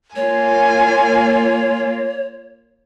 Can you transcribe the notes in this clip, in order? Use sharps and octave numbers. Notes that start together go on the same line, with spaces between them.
A#3 F4 C#5 G#5